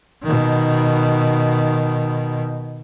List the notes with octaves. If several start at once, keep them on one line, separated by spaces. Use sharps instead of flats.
B2 D#3